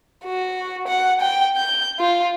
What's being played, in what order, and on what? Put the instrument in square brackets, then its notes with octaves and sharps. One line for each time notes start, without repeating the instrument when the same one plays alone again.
[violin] F#4
F#5
G5
G6
F4